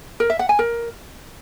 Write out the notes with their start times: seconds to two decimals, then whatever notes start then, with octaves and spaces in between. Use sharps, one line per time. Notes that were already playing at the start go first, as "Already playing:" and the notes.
0.20 A#4
0.30 E5
0.39 F#5
0.49 G#5
0.59 A#4